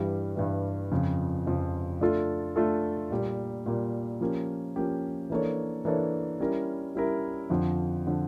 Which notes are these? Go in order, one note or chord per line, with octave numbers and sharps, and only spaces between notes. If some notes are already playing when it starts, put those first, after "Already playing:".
Already playing: G2 E3 G3
G2 E3 G3
F2 C#3 F3
F2 C#3 F3
A3 D4 F4 A4
A3 D4 F4 A4
A#2 G3 A#3
A#2 G3 A#3
F3 A#3 C#4 G4
F3 A#3 C#4 G4
E3 A#3 D4 A4 C#5
E3 A#3 D4 A4 C#5
G3 C#4 E4 A#4
G3 C#4 E4 A#4
F2 D3 F3
D3 F3